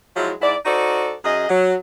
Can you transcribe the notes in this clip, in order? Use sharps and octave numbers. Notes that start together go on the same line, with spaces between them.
F3 F#3 G#3 E4
G#2 E4 D5
D#4 F#4 A4 C5 D5
F#2 G#4 D#5
F#3